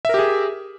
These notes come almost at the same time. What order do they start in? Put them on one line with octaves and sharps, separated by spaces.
E5 A#4 G4 G#4